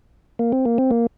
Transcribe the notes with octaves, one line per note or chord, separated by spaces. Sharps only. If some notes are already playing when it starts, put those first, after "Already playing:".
A#3
C4
A#3
C4
A#3